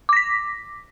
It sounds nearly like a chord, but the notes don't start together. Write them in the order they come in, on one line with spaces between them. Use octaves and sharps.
D6 A#6 B6